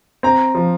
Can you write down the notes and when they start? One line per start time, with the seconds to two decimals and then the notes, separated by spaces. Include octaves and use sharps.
0.23 C4 A#5
0.55 F3